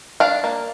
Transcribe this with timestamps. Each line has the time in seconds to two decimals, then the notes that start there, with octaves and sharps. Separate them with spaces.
0.20 D4 F5
0.44 A#3